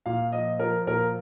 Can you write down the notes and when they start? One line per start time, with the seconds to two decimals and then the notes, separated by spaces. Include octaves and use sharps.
0.06 A#2 F5
0.32 F3 D#5
0.59 F3 A#4
0.87 A#2 A#4